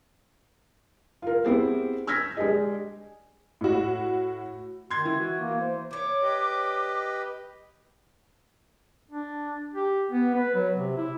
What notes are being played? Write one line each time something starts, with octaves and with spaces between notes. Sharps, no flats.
F4 A#4
B3 C4 E4 G4 G#4 C5
E6 F6 G6 G#6 A#6 B6
G#3 D4 G4 G#4 D#5
A2 F#4
D#3 C6 G#6
E3
F#4
A#3
C5
D4 C#5 D6
G4 B4 D#5
D4
G4
B3
B4
F#3
C3
E4